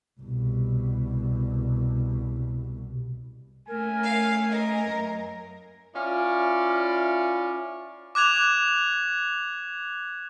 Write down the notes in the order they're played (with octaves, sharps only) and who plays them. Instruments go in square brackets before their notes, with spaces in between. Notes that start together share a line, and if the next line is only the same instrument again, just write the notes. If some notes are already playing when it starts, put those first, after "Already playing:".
[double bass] C2 B2
[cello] A3 C#4 [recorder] A#4 [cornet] G#5
[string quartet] F5
[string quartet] A#4 [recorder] D#5
[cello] F#2
[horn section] C#4 E4 F4 D5
[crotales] D6 F#6 G#6 F7